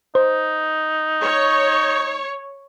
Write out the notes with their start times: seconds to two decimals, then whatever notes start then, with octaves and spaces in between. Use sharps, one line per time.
0.15 D#4 C5
1.23 C#5